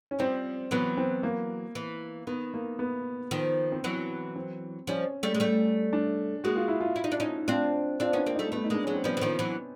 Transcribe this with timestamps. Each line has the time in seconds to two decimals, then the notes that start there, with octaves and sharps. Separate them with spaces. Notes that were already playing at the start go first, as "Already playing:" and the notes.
0.11 C#4
0.19 F3 G3 C4
0.71 E3 F#3 B3
0.97 C4
1.23 A#3
1.75 E3
2.27 D#3 B3
2.54 A#3
2.79 B3
3.31 D#3 F3
3.72 C4
3.84 E3 F#3 B3
4.36 C4
4.87 F3 G3 C#4
5.23 G3 A3
5.35 G#3
5.40 G3 A3
5.93 D4
6.44 G#3 A#3 F#4
6.56 F4
6.68 E4
6.81 F4
6.96 E4
7.04 D#4
7.12 D4
7.20 C#4 D#4
7.48 C4 D4 F4
8.00 C4 D4 F4
8.13 B3 C#4 D4
8.26 A#3 C4
8.35 G3 A3 D#4
8.52 G3 A3 B3
8.64 D#4
8.70 G#3 A#3 D4
8.84 F#3 G#3 C#4
8.94 C4
9.04 F3 G3 B3
9.17 E3
9.21 D#3 F3
9.39 E3 F#3